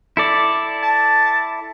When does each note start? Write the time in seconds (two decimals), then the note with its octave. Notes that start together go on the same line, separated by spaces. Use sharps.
0.17 E4 A4 D5
0.83 A5